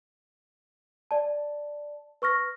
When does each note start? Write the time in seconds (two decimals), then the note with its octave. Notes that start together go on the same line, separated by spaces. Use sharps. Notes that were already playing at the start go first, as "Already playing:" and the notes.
1.11 D5 A5
2.22 B4 C#6 F6 A#6